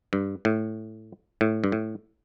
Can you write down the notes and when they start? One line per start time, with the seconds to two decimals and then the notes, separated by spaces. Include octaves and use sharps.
0.13 G2
0.45 A2
1.41 A2
1.64 G2
1.72 A2